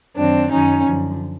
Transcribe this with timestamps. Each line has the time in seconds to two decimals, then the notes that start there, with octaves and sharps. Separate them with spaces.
0.16 F#2 D#3 F#3 C4 D4
0.50 F#2 D#3 F#3 C#4 D#4
0.85 F#2 D3 F3